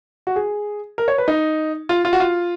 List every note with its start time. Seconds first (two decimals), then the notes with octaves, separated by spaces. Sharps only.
0.27 F#4
0.36 G#4
0.98 A#4
1.08 C#5
1.18 B4
1.28 D#4
1.89 F4
2.05 F4
2.13 F#4
2.20 F4